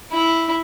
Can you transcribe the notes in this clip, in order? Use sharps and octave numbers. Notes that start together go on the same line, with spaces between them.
E4